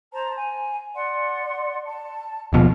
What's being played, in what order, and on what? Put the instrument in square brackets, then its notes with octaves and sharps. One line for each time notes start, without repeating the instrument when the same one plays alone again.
[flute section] C5 A5 A#5
G#5
D5 F#5 C6
A5
[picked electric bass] D#1 B2 F3